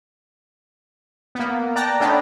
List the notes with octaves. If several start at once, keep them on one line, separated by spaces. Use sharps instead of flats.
A#3 B3
D5 G5 A5 A#5 F#6 A#6
A3 B3 C#4 D4 D5 G5